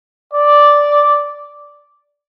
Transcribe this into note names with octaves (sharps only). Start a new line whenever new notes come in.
D5